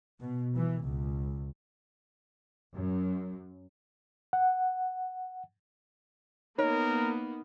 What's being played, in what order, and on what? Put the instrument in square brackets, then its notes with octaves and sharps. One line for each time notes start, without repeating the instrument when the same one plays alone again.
[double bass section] B2
E3
C#2
F#2
[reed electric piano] F#5
[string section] A#3 B3 [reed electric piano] D#4 [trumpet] A#4 [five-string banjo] C#5